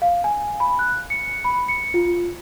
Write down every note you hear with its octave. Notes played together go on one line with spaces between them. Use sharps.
F5
G#5
B5
F#6
C#7
B5
C#7
F4